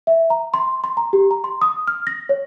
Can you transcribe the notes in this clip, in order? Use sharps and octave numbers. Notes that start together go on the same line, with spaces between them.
E5
A#5
C6
C6
A#5
G4
A#5
C6
D#6
F6
A#6
C#5